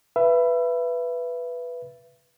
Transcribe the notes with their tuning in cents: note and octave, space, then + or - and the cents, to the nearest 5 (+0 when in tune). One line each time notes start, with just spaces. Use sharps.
B4 +0 E5 +30